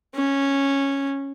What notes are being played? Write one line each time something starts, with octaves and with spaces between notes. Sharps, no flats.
C#4